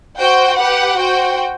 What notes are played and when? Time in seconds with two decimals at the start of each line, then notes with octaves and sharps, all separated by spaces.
0.18 F#4 C5 G5
0.58 G4 B4 F#5
0.99 F#4 C5 G5